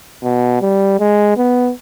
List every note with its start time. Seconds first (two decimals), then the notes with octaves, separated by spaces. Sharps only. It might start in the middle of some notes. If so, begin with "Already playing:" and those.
0.23 B2
0.61 G3
1.00 G#3
1.37 B3